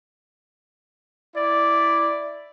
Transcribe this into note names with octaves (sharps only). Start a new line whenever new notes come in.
E4 D5